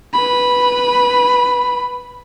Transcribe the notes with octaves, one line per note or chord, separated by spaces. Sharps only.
B4 B5